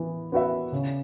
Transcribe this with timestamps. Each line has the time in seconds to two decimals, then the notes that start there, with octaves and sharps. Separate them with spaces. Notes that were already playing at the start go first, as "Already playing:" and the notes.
Already playing: E3 B3
0.32 B3 F#4 B4 E5
0.72 C#3